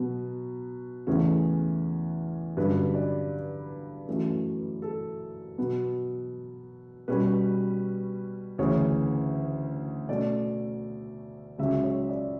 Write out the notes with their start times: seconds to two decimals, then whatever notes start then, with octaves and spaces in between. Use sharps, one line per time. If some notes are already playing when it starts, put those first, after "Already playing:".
Already playing: B2 F#3 B3
1.07 E2 C#3 E3 A3 C#4
2.57 G2 D3 F#3 C#4 B4
2.94 D5
4.08 F#2 E3 A3 C#4
4.82 A4
5.58 B2 F#3 B3
7.08 B2 G3 C#4 B4
8.58 D2 C#3 E3 C#5
10.09 B2 A3 C#4 D5
11.58 C#2 C#3 F#3 C#4 E5
11.84 C#5
12.09 D5